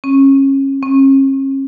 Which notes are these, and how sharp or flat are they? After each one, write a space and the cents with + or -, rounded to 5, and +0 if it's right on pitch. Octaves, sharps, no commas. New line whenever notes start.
C#4 -25
C#4 -40